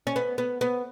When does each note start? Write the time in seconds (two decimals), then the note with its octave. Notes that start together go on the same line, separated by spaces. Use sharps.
0.07 C#4
0.16 B3
0.38 B3
0.61 B3